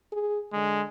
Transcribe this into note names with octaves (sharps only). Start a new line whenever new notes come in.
G#4
D3 G#3